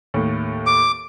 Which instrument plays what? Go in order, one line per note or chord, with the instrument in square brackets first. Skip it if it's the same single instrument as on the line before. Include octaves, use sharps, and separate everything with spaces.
[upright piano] D#2 A2
[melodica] D6